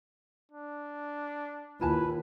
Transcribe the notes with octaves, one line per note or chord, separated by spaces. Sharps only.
D4
D#2 E4 F4 B4 G#5 A5